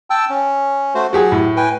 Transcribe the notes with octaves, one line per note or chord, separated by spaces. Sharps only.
G5 A5 E6
C#4
A3 F#4 C5
F#3 G4 G#4 F#5
A2
B4 G5 G#5